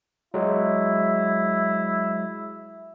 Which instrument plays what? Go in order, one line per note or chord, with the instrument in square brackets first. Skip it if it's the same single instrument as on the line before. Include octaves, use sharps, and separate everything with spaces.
[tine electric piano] F#3 G#3 [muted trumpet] E4